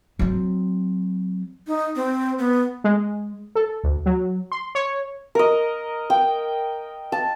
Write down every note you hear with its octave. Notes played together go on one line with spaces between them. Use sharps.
F#3 C4
D#4
C4
B3
G#3
A4
D2
F#3
C6
C#5
A#4 D#5
G5
A5